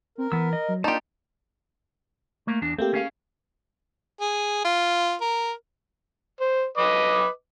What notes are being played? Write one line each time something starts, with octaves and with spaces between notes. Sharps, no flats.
C4 A#4
E3 B3 E6
D#5
F#3
A#3 D4 D#4 F4 G4 D5 A5
A3 A#3
E2 D4
A3 A#3 C4 G4
C#4 G#4 F5
G#4
F4
A#4
C5
B4 D#5 D6